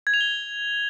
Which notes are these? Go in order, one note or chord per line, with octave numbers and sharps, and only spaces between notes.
G#6
F7
G7